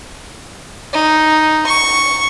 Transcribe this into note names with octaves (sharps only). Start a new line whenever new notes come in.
D#4
C#6